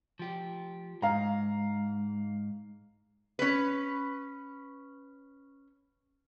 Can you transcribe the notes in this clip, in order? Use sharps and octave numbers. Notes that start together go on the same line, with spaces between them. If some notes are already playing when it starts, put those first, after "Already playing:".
F3 G4
G#2 F5 A#5
C#4 B4